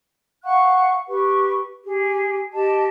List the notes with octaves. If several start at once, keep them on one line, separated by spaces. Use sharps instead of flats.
F5 F#5 C#6 F#6
G4 B4 C#6
G4 G#4
G4 D#5 A5